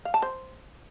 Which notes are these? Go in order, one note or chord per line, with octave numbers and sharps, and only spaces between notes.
F5
A5
C5